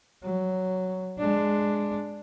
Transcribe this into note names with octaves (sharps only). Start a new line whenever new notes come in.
F#3
G#3 D4